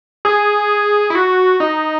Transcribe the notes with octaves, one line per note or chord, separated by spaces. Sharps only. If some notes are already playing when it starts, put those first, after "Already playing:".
G#4
E4
F#4
D#4